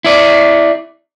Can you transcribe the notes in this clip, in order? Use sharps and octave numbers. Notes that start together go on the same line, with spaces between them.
E4 D5